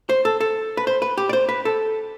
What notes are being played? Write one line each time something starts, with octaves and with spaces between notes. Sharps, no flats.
C5
A4
A4
B4
C5
B4
G4
D5
C5
B4
A4